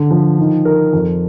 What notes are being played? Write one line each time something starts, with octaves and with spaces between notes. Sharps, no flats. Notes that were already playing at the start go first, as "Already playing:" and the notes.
Already playing: D3
F3
D#3
A#4
F2